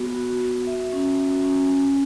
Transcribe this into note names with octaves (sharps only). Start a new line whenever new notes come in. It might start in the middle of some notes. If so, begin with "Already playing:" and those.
Already playing: B3 F#4
F#4
F#4
E5
C#4
F#4
C#4
C#4